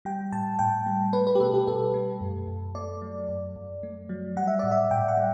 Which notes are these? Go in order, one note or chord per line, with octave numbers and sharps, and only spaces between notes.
G3 G5
A2 A5
A2 G5
G3
A3 B4
B4
G4
B2 A4
G4
B2 A4
A3
F#2
F#2
A3 D5
F#3
F#2
F#2
A3
F#3
G3 F#5
E5
A2 D5
E5
A2 G5
F#5
G3